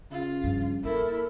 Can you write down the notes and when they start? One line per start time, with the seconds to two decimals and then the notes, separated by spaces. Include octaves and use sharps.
0.11 C#3 F4
0.44 G2 F3
0.84 A#3 B3 E4 A4 A#4